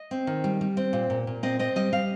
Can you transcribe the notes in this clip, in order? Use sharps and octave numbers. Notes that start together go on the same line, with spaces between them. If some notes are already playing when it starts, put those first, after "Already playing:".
Already playing: D#5
C4
D#3
G3
G3
C4
A#2
A#2
A#2
C4 D#5
C4 D#5
G3 D#5
G3 F5